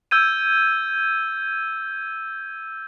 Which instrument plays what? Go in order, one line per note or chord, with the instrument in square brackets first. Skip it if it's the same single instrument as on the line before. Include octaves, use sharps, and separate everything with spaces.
[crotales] E6 G6 G#6 D#7